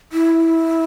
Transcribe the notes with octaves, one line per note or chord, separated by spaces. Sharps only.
E4